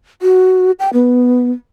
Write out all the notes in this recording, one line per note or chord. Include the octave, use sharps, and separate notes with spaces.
F#4
G5
B3